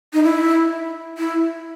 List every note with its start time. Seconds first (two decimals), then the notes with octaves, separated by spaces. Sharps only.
0.13 D#4
0.24 E4
1.18 E4